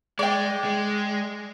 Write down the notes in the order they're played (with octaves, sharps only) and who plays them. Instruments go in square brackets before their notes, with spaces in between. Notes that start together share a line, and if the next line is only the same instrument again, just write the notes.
[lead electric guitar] G#3 [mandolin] D5 G5
[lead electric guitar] G#3